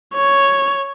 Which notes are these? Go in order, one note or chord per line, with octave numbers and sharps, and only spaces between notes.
C#5